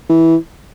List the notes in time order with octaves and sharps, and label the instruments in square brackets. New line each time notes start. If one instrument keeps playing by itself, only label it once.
[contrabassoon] E3